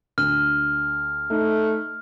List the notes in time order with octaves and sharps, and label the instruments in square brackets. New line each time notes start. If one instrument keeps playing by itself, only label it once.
[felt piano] D2 [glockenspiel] F6
[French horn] A3 [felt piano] D#4